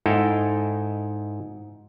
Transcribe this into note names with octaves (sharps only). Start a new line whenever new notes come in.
G#2 D#4 E4 A4 F5 G5